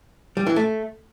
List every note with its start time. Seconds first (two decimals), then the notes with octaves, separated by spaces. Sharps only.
0.37 G3
0.47 E3
0.56 A3